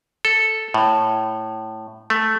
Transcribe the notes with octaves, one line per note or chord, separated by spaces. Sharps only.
A4
A2
A3